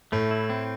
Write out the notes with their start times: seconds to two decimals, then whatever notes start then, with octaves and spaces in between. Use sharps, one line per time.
0.12 A2 A3
0.31 E4
0.50 C4